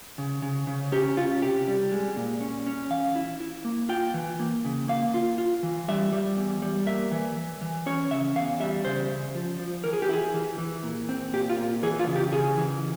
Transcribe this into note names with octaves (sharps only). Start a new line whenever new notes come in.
C#3
C#3
C#3
C#4 G4
C#4 F4
C3 G4
G3
G#3
A#2
C#4
C#4
E3 F5
E4
E4
A#3
F4 G5
E3
A#3
C#3
A#3 F5
F4
F4
E3
G3 E5
G3
E2
G3
A#3 E5
E3
E3
E3
C#4 C#5
C#3 E5
E2 F5
G3 E5
C#3 C5
C#3
F3
F3
E3 A#4
G#4
G4
E4 G#4
E3
E3
A#2
C4
A#2 G4
F4
A#2
E3 G#4
F4
C#3
G4
C#3 G#4
E3